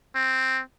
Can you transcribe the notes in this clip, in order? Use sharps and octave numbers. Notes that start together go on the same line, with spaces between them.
C4